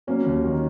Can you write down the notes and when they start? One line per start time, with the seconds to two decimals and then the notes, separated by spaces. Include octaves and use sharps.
0.07 F#3 A#3 C#4
0.26 D#2
0.44 D#3